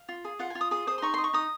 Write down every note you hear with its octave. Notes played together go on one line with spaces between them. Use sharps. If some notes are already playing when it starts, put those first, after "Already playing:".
Already playing: F5
F4
G#4
F4 F#5
G#5
F4
D#6
G#4 D#6
C5 D#6
C6
D#4 C#6
C6
D#5
C#6
D#4 D#6